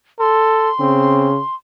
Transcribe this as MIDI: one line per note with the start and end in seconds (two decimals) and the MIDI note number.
0.20 0.70 69
0.20 1.55 84
0.80 1.39 49
0.80 1.29 60